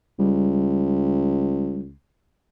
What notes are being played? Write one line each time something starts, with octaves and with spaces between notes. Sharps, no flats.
C#2 G3